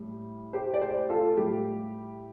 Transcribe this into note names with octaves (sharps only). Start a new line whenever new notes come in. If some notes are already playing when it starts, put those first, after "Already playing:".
Already playing: A2 G3
G4 C5
D5
G4 C5
F4 A4
A2 G3 G4